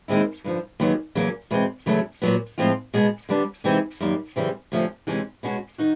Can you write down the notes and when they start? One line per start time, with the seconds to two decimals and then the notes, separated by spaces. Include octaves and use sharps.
0.08 D#2 D#3 G#3 C4 E4
0.44 G2 D3 F3
0.80 D#2 C#3 F#3 B3
1.15 E2 C#3 F#3 A#3 C#4
1.51 E2 B2 G#3 C4
1.86 E2 C#3 F#3 A3
2.22 A#2 F#3 B3
2.58 A2 F3 G#3 C4 F4
2.94 B2 G#3 B3
3.29 D3 G3 B3 D4
3.64 C3 E3 G#3 C4 D#4
4.01 F#2 D#3 G3 A#3
4.36 F#2 C#3 E3 G3 C4
4.72 D2 C3 F3 A3 C#4
5.07 F2 C3 E3 G#3 C#4
5.43 B2 G#3 C#4 F#4
5.78 D#3 D#4 F#4